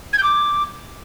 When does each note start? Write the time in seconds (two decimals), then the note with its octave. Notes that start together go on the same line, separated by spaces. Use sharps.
0.13 G#6
0.18 G6
0.23 D6